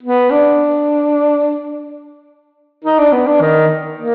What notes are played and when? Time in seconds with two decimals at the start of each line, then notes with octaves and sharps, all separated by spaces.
0.03 B3
0.31 D4
2.84 D#4
2.98 D4
3.13 B3
3.27 D4
3.41 D#3
3.98 A#3